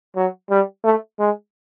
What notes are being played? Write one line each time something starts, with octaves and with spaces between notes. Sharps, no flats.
F#3
G3
A3
G#3